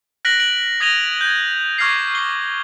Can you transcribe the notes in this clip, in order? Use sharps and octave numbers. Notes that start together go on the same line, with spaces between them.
F6 F#6 A#6 B6 D7 F#7
D7 F#7
D#6 G#6 A#6 D#7 F7 G7
G6 G#6
C#6 D6 F6 G#6 A#6 C7
C7 G7